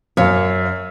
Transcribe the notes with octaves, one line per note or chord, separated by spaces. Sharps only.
F#2 C#5 F5